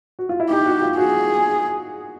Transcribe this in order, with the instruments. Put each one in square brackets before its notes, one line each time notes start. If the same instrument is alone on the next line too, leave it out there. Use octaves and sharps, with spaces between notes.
[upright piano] F#4
F4
E4
[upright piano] D#4 [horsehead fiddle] G4
[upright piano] F#4
F4
[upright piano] F#4 [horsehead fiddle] G#4